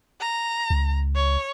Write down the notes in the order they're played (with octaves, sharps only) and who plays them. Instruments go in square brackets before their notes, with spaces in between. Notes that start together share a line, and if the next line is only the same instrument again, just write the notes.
[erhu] A#5
[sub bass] C#2
[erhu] C#5